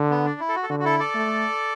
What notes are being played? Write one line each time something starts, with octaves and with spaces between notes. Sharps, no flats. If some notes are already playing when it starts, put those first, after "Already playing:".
Already playing: D3
B3
D4
E4
A4
F#4
A4
D3 F#4
F#4
E4 A4
A4 D5
A3